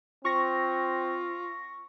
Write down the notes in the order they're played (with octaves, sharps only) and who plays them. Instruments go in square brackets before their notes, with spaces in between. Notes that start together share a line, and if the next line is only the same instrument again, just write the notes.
[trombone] C4 [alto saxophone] F4 [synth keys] C#6 A#6